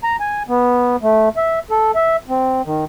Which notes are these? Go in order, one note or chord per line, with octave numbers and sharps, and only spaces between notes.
A#5
G#5
B3
A3
E5
A4
E5
C4
D#3